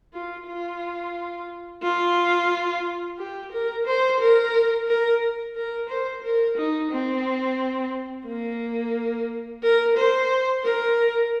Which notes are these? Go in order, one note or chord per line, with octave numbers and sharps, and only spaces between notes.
F4
F4
F4
G4
A#4
C5
A#4
A#4
A#4
C5
A#4
D#4
C4
A#3
A#4
C5
A#4